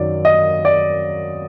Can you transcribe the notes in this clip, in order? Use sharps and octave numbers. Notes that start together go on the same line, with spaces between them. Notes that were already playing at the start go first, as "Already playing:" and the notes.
Already playing: F#2 D#3 F#3 D5
D#5
D5